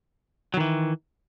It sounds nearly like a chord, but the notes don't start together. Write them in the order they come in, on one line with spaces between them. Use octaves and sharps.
F#3 D#3 E3